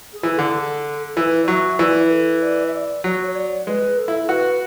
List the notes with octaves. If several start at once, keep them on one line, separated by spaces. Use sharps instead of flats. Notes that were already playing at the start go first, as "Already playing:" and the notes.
G#4
E3
D3 A4
G#4
A4
A4
E3 B4
D5
F#3 E5
E3 D5
B4
A4
D5
E5
D5
F#3 C#5
C#5
D5
G#3 B4
A4
E4
A4
F#4 B4